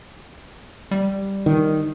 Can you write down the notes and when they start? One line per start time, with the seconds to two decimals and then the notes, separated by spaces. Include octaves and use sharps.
0.91 G3
1.46 D#3